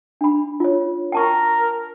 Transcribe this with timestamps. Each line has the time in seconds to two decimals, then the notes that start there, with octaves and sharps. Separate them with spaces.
0.21 D4 B5
0.60 F4 C#5
1.12 A#4 G5 A5 C#6